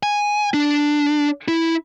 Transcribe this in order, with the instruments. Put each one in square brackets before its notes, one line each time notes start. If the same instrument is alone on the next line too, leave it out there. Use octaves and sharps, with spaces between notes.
[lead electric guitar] G#5
D4
E4